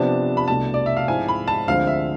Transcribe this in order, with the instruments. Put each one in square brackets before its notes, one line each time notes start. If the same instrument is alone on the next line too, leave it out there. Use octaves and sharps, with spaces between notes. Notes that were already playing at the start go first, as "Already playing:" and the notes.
Already playing: [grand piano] C3 F3 B3 D4 [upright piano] A5
[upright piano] B5
[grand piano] C2 B2 A3 D4 [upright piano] A5
[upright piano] D5
E5
F5
[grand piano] G#2 F3 G#3 C4 E4 [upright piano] G#5
[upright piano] B5
A5
[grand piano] D2 D3 F3 G#3 C4 [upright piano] F5
[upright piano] E5